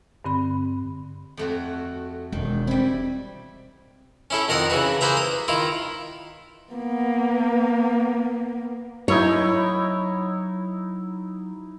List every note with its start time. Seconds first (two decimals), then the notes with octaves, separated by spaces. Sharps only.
0.24 G2 D3 C4 B5
1.37 F2 A3 F#4
2.32 E1 D#3
2.67 G3 C4 E4
4.30 C#4 E4 A4
4.48 F2 D#3 A#4 F#5 D#6
4.70 C#3 E3 F#4 B4
5.01 A#3 G#4 B4 C5 E5 A#5
5.17 D#6
5.48 D#3 E4 F4
6.72 A#3 B3
9.08 F#3 D#4 E4 C#5 E5 C#6